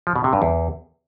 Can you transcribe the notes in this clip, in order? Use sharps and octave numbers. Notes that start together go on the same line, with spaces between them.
F3
B2
C3
G2
E2